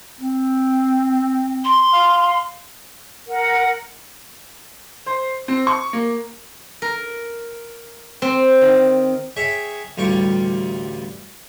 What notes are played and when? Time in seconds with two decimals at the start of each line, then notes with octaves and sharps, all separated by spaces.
0.20 C4
1.65 C6
1.93 F5
3.27 A#4 F#5
5.06 C5
5.48 C4
5.67 C#6
5.93 A#3
6.82 A#4
8.22 C4
8.61 D#3
9.36 G#4 C#5 E5 G5
9.97 A1 D2 G3 F4 G5 C#6